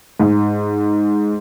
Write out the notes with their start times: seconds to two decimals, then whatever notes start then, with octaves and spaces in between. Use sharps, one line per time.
0.20 G#2